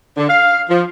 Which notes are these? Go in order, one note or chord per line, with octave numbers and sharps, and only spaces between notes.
D3
F5
F3